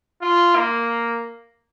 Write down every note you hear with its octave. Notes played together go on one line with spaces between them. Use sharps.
F4
A#3